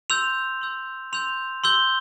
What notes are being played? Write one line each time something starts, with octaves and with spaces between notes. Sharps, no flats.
C6 E6 G6 F7
C6 E6 G6
C6 E6 G6 F7
C6 E6 G6 G7